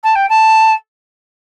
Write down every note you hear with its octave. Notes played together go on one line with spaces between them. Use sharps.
A5
G5
A5